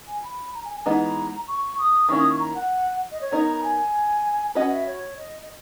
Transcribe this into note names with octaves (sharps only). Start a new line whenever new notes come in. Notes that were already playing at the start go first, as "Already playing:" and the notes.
G#5
B5
A#5
G#5
G#5
E3 G#3 B3 D#4 A#5
C#6
D#6
D#3 A#3 C#4 E4 C#6
D#6
C#6
A#5
F#5
D#5
C#5
B3 D#4 A#4 C#5 A#5
A#5
G#5
C#4 F#4 B4 D#5 F#5
E5
C#5
D#5
D#5